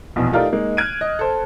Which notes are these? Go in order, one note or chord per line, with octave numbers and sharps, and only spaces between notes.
A#1 E2 B2
A3 D#4 F4 G4 A#4 D5
G#3 A#3 D#4
F6 F#6 G#6 D7 D#7
D#5
A4 C5